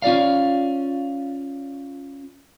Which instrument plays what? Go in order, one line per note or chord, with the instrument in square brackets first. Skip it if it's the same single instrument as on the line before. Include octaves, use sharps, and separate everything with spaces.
[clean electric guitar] C#4 F4 D5 F5